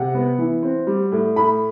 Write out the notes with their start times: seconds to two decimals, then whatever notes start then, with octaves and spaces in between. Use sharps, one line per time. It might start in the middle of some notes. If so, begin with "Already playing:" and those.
Already playing: C3 F#5
0.15 B3
0.38 E3
0.63 C4
0.87 G3
1.12 A2
1.36 A2 B5